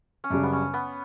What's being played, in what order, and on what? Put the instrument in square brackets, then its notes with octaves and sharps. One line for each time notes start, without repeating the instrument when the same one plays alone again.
[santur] C#4
[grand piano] F#2 C#3 G3 [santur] D4
[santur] B3
C#4
B3